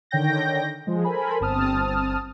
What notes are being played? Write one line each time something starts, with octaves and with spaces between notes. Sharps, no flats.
D3 D#3 C#5 G5 G6 A#6
F3 G#3
A4 A#4 C5 G#5 B5
G1 C4 A5 D#6 F6